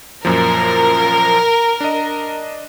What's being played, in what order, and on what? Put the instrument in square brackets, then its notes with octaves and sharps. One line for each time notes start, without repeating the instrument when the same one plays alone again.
[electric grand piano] F#2 A#2 F3 [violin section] A#4
[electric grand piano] D4 D#5